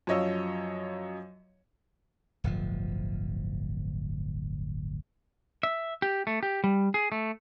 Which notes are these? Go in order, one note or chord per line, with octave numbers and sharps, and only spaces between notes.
F#2 F3 C#5 D#5 F5 E6
D1 G1 F3
E5
G4
A3
G4
G3
G#4
A3